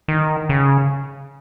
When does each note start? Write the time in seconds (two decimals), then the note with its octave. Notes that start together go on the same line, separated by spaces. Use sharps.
0.08 D#3
0.49 C#3